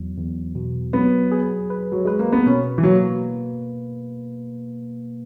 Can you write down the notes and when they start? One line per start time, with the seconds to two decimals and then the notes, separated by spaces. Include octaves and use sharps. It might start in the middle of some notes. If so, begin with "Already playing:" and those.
Already playing: E2 F#3
0.18 E2
0.55 B2
0.93 F#3 B3
1.32 G#4
1.70 B4
1.92 F#3
2.05 G#3 B4
2.19 A#3
2.32 B3
2.46 B2 C#4
2.78 E3
2.83 F#3 A#3